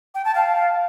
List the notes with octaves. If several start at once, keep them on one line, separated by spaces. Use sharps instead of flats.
G5
A5
F5